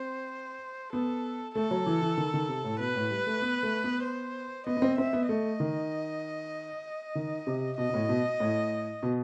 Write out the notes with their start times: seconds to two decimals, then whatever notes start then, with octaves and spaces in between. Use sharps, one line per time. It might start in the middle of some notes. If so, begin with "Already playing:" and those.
Already playing: C4 C5
0.93 B3 A4
1.55 A3 A4
1.71 F#3
1.86 E3
2.02 E3
2.17 D#3
2.34 D#3
2.49 C3
2.64 A2
2.80 B2 B4
2.95 A2
3.11 G3
3.27 A3
3.42 B3
3.63 A3
3.84 B3
4.04 C5
4.67 B3 D#5
4.77 B3
4.82 C4
4.98 C4 E5
5.13 B3
5.29 A3 D#5
5.60 D#3
7.15 D#3
7.47 C3
7.78 B2 D#5
7.89 B2
7.94 A2
8.09 B2
8.40 A2
9.03 B2